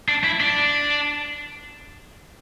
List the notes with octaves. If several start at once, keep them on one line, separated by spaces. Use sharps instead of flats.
D4
E4
D4